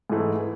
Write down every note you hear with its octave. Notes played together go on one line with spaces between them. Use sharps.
G#2 E3 A3